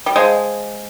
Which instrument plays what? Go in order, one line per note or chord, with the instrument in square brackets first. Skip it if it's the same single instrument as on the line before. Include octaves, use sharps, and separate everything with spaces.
[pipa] G3
[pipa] G#3 [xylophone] C5 F5 A5